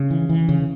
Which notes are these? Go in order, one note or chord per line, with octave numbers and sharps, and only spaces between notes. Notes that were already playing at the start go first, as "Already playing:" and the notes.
Already playing: C#3
E3
E3
C#3